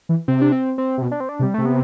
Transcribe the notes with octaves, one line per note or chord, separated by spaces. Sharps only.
E3
C3 C4
D4
C4
C4
C3
B2
D4
C4
D4
C3
G3
C3 A3
B3